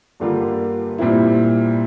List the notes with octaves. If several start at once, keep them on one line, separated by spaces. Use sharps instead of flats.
G2 D3 G3 A#3 F4
A#2 G3 C4 E4